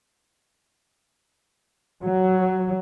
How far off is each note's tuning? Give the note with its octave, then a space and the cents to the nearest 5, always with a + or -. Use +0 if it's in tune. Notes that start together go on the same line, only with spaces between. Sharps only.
F#3 +10